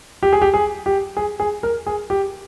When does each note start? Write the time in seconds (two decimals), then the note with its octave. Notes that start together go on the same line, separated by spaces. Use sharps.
0.23 G4
0.33 G#4
0.42 G4
0.54 G#4
0.86 G4
1.17 G#4
1.40 G#4
1.63 A#4
1.87 G#4
2.10 G4